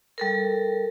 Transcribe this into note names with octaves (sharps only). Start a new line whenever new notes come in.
G3 A4 A#4